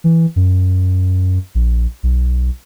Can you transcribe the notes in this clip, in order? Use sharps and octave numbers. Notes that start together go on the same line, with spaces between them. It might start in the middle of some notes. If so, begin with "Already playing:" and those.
E3
F#2
A#1
B1